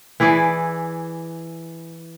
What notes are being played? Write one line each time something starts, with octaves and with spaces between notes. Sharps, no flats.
E3 E4 G#4 D5